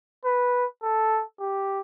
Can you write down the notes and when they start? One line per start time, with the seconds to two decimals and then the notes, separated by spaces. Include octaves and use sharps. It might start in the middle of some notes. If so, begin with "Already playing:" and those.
0.25 B4
0.83 A4
1.40 G4